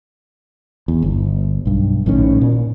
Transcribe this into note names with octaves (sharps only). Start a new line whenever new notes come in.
E2
G1
B1 G2
A#1 A2 D#3 C#4
A#2